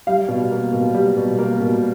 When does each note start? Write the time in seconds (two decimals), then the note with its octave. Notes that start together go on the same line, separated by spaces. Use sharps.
0.07 G3 F5
0.28 B2
0.51 A#3
0.73 B2
0.94 G3
1.17 B2
1.38 A#3
1.60 B2